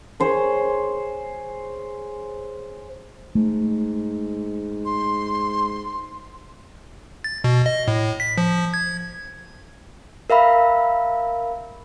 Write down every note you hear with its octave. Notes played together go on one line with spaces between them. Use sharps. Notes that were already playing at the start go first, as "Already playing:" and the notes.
G#4 C5 C#5
G#2 A3
C6
A6
B2
D#5
A2
B6
F3
G#6
A#4 E5 F5 B5